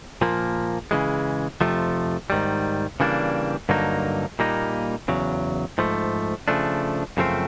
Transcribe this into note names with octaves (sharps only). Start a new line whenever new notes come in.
A#2 F3 A#3
C#3 E3 G#3
F2 C3 F3 A3
G#2 D#3 G3
C#3 E3 G3 A#3 D4
G2 D3 F#3 A#3 D#4
A#2 G3 A#3 D#4
E2 C#3 F#3
G#2 F3 A3
C#3 F3 A3 D4
F#2 C#3 F3 A3 C4